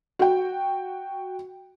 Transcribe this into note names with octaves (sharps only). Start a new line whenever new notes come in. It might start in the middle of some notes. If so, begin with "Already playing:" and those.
F#4 G5